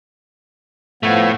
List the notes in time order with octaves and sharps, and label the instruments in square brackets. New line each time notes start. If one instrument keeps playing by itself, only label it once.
[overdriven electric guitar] A2 A3 [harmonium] F3 B3